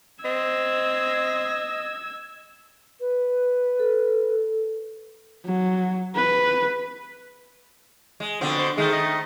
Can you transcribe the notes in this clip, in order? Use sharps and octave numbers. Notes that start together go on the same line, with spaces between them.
C4 D#5 E6 G#6
B4
A4
F#3
B4
G#3
B2 D3 F3 C4
C5
D#3 G#3 A3
D#5